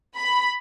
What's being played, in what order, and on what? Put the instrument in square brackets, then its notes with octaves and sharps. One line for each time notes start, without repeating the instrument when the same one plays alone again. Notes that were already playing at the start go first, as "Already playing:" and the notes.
[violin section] B5